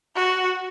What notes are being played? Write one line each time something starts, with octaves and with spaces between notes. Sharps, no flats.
F#4